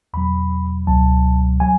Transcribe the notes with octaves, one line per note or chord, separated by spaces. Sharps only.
E2 B2 F#3 B5
C#2 B2 F#3 A5
F#3 G#5